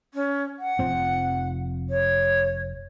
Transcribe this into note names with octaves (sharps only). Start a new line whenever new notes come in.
C#4
F#5
F1 F3 C4
C#5